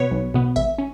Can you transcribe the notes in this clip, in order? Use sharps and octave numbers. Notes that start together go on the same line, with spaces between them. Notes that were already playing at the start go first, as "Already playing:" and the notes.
Already playing: B2 B3 B4 C#5
B1
B2 B3
G#1 E5
C#4